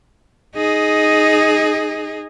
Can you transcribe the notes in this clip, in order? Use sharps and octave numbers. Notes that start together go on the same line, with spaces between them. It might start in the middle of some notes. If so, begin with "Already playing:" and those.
D#4 G#4